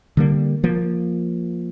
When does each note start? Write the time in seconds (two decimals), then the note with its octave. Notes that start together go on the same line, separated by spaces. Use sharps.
0.17 D3 G3 A#3
0.64 F3 A#3